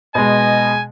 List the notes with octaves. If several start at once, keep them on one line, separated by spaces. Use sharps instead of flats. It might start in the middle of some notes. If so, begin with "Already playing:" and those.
B2 G#3 D#5 G#5